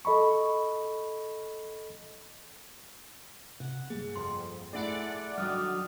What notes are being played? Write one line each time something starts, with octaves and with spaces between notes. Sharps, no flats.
A4 D#5 B5 C#6
C3 F#5
G1 G3 A#3 G#4
F2 C6
A3 E4 G#4 D5 F#5
D3 D#3 F#3 G3 D#6 F6